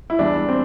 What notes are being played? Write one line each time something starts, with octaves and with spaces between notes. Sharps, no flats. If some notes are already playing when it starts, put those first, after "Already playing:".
E4
E2 E3 G3 D4
C4